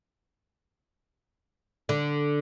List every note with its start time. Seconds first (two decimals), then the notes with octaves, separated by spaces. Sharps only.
1.89 D3